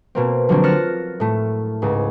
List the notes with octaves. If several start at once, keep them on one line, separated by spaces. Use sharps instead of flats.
B2 A#3 C4
D3 F3 F#3 A#3 C4 D4
F6 F#6 A6 A#6 C#7 E7
A2 A3
C#2 G#2